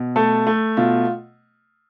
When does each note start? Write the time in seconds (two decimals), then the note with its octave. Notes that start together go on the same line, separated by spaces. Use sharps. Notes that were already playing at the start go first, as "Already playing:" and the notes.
Already playing: B2
0.16 A3 A4
0.47 A3
0.77 B2 F4